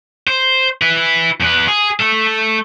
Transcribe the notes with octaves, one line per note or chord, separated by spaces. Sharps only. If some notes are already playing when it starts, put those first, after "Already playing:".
C5
E4 B4
E2 B4
G#4
A3 A4